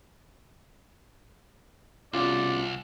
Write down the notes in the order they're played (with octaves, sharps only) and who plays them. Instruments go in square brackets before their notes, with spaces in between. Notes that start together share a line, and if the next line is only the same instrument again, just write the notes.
[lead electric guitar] C2 [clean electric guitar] B2 C#4 [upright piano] F4 [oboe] D5